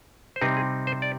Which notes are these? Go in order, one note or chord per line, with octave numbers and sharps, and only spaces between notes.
C5
C3 G3 C4 D#4 B4
G#4
C5
D5